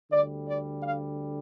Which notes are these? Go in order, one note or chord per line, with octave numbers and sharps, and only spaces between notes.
D2 D3 G3 D5
D5
F5